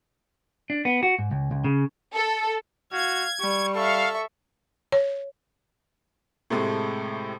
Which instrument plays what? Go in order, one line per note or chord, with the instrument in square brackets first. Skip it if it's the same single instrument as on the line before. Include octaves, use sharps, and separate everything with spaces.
[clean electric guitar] D4
B3
F#4
G#2
C#2
C#2
C#3
[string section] A4
[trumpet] F#4 [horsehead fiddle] F5 [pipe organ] G#6
[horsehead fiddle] G3 [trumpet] C#6
[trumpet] A4 [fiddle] E5 C#6 [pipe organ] F5
[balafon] C#5
[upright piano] A2 C3 G#3 A3